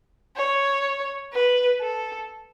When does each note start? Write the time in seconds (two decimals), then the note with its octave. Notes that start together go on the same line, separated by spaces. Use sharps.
0.36 C#5
1.33 B4
1.81 A4